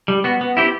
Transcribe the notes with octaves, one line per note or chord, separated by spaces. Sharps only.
G3
B3 F#4
B3
E4 G4 C5